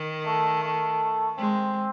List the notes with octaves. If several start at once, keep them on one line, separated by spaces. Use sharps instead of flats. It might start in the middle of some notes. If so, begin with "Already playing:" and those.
Already playing: D#3
A3
A3
G#3 C4